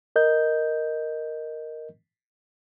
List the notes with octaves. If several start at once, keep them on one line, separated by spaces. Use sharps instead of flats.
A#4 D#5 G6